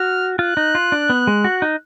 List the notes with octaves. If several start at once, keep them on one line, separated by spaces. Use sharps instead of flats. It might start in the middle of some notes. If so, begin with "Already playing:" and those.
Already playing: F#4 F6
F4 F#6
D#4
F4
D4
B3
G#3
F#4
D#4